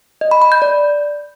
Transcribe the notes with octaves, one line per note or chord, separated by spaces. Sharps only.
D#5
B5
B5
G6
D5